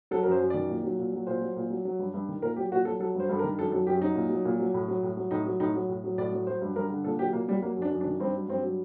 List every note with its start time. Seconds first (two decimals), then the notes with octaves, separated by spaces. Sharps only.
0.11 F#3 A4
0.23 F#2 A#4
0.31 C5
0.40 F#2
0.50 D#3 D5
0.69 A#2
0.84 F#3
0.99 A#2
1.13 F#3
1.27 A#2 C5
1.42 F#3
1.56 A#2
1.70 F#3
1.85 F#3
1.99 G2
2.14 G2
2.29 D#3
2.42 A#2 A#4
2.56 F#3 G4
2.72 A#2 F#4
2.85 F#3 A4
3.00 F#3 A4
3.15 G2 C5
3.29 G2 A4
3.39 A#4
3.44 D#3
3.58 F#2 A4
3.72 F#3 A4
3.87 F#2 G4
4.02 F#3 D#4
4.15 A#2
4.30 F#3
4.45 A#2
4.59 F#3
4.74 A2
4.88 F#3
5.03 A2
5.17 F#3
5.31 A2 D#4
5.46 F#3
5.60 A2 D#4
5.74 F#3
5.89 A2
6.04 F#3
6.18 A2 D5
6.32 F#3
6.47 F#3 C5
6.62 G2
6.75 G2 A#4
6.90 D3
7.04 A#2 A4
7.19 F#3 G4
7.33 A#2 A#3
7.48 F#3 G3
7.62 F#3 A#3
7.76 F#2
7.82 D4
7.91 F#2
8.01 D4
8.06 D#3
8.20 G2 C4
8.34 F#3
8.49 G2 C4
8.63 F#3